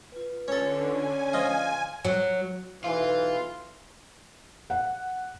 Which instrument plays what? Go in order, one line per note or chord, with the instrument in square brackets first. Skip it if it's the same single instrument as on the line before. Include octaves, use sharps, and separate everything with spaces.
[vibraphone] F4 B4
[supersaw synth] D3 [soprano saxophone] C#4 [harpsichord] A4 C#5
[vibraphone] D5 C#6 [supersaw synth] G#5
[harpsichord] F3 D#5 F5
[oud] F#3
[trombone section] B1 E3 [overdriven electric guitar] F4
[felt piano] F#5